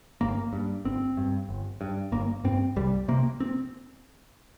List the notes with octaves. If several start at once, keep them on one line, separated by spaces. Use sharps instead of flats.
G1 A#3
G2
G1 C4
G2
G1
G2
G1 A#3
G2 C4
C2 G3
C3 A#3
C4